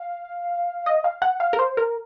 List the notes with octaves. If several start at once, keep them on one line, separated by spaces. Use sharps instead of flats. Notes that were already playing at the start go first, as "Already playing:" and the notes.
Already playing: F5
D#5
F5
F#5
F5
A#4
C5
A#4